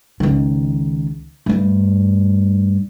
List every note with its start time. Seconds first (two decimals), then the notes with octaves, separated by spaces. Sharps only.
0.20 C#2 D#3
1.46 G2 A3